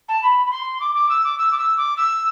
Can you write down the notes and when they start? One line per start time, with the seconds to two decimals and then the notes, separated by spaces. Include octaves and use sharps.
0.08 A5
0.22 B5
0.45 B5
0.51 C6
0.80 D6
0.95 D6
1.09 E6
1.24 D6
1.38 E6
1.52 D6
1.58 E6
1.77 D6
1.96 E6